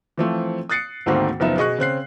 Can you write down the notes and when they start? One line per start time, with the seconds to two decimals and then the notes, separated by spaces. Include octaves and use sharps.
0.18 E3 F3 A3 C4
0.69 D#6 F#6 A6 C7 C#7
1.06 D2 G#2 D#3 A3 A#3 C4
1.40 F#1 F3 B3 D#4 E5
1.57 B2 G#4 D#5 C#6 F#6
1.79 C#3 C4 F#6 C7